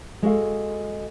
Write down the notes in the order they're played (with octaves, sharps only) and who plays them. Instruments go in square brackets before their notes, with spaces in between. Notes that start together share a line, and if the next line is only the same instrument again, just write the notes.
[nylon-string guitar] G#3 F#4 A4 F5